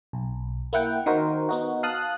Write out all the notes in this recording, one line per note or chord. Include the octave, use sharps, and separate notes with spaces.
B1
A#3 E4 F#5 G5
D#3 D#4 F#4 A#4 C5
B3 D#4 F#4
F5 A5 D#6 F#6